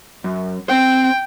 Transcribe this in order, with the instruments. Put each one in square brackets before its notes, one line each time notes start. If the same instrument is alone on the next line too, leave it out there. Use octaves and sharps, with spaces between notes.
[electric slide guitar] F#2
[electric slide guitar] C4 C5 [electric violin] G5